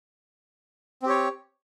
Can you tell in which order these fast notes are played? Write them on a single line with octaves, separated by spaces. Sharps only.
C4 G4 C#5